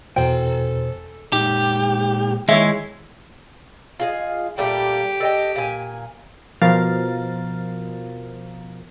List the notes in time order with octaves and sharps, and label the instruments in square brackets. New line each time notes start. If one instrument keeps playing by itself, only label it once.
[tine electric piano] E2 B2 C5 [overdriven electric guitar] A4 G#5 [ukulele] G5
[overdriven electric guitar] A#2 G#3 [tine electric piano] D#4 [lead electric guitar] G4
[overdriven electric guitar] D#3 [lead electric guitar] G#3 [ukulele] E4 C#5 E5
[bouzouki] F4 G#4 D#5
[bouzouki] A#2 G3 A3 [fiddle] G4
[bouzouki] A4 D#5 G5
A#2 G#5
[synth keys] B2 F3 A#4 F5 A6